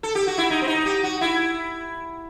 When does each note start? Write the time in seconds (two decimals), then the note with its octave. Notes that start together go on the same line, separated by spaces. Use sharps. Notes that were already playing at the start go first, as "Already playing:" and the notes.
0.03 A4
0.15 G4
0.27 F#4
0.38 E4
0.51 D#4
0.62 C4
0.68 D#4
0.86 G4
1.03 F#4
1.21 E4